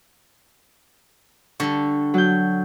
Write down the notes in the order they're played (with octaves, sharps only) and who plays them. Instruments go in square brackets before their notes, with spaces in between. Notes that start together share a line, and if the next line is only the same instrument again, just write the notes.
[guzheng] D3 G3 A4 [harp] C#6
[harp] F#3 G6